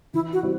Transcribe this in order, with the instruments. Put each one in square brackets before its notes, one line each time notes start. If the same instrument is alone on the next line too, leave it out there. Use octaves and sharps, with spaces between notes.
[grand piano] E3 [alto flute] E4
[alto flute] F#4
[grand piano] G3 C4 E4